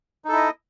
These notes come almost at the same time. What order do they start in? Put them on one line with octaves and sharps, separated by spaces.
D#4 A4 E4 D#5